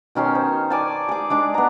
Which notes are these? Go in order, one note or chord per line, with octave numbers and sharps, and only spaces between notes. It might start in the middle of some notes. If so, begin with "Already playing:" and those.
B2 D#3 C#4 C6
C5
D5 G#5 A5
G#4 D6
G#3 D4 D6
B3 A#5